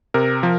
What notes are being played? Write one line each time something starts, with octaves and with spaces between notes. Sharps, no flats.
C3 A#4
F3